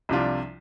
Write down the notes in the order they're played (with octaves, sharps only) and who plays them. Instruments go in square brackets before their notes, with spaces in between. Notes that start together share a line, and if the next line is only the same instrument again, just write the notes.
[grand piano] C2 C3 F3 D4 F4